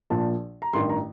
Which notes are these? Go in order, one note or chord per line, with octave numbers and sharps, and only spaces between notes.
A#1 A#2 F3 A5
A#5
A1 G2 D#3 C6
A#5